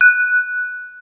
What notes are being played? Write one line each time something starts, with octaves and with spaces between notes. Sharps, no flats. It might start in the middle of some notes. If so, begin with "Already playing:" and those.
F#6